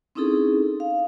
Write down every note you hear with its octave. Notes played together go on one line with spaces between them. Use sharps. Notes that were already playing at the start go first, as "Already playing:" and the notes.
C4 C#4 D#4 E4 G#4 A4
F5